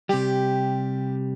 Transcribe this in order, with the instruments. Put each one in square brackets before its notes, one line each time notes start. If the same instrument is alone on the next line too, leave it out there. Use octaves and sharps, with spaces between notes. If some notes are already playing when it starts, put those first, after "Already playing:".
[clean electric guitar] C3 G3 [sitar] G4